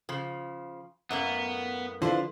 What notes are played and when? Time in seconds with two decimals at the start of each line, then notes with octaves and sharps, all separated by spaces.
0.09 C#3 F3
1.11 F#2 A2 A#3 B3
2.02 D3 F3 D4 E4 F4 B4 C5